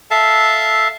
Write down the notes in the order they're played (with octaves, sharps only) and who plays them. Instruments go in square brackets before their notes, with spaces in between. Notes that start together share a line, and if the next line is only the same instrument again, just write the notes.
[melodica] A4 E5 F5 A5